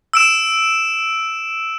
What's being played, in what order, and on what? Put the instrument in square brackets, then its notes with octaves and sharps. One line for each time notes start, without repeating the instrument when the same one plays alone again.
[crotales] E6 D7 E7